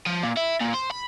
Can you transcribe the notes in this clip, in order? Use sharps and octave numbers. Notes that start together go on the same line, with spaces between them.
F3
A#2
E4
A#2
C5
B5